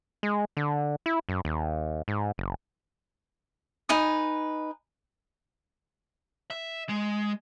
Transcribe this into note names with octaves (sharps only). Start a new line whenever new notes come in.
G#3
D3
E4
F#2
D#2
G#2
F#1
D#4 B4 G#5 D#6
E5
G#3